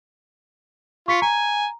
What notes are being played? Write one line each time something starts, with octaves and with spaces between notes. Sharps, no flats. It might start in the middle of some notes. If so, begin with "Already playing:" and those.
F4 C#6 B6 C#7
G#5 A#5